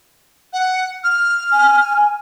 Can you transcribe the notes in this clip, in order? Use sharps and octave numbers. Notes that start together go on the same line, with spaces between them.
F#5
F6
G#5